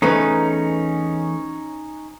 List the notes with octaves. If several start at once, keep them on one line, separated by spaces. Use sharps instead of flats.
E2 A3 C#4 D#4 B4